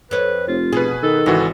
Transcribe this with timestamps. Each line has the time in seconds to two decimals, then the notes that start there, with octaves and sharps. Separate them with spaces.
0.11 F2 B4 C#5
0.48 F1 F4
0.73 B2 G#4 B4
1.03 D#3 A4
1.26 G#1 C#3 E3 F#4